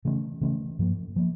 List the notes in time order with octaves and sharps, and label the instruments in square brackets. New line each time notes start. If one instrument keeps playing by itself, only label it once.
[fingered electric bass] C#3 E3 A3 C#4
C#3 E3 A3 C#4
G2 F3 A#3
F3 A#3